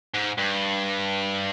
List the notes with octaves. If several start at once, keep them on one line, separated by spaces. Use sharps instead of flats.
G#2
G2